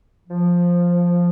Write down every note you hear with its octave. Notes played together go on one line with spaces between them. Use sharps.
F3